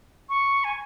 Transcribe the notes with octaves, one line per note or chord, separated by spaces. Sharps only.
C#6
G#5